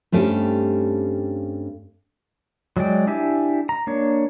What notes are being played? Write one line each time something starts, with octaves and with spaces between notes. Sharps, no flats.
G2 A3 C4 C#4 G4
F#3 G#3 D5 G5
D4 E4 G4 E5 G#5
A#5
A#3 D4 C#5